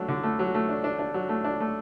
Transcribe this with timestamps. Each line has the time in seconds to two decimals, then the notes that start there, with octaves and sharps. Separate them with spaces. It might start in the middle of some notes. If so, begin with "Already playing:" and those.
Already playing: F#3 A3 D4
0.08 D3
0.23 A3
0.39 F#3
0.54 A3
0.69 D4
0.84 D4
0.99 D4
1.14 F#3
1.29 A3
1.44 D4
1.60 A3